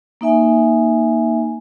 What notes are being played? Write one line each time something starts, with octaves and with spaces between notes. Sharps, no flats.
A#3 D#4 E5 G#5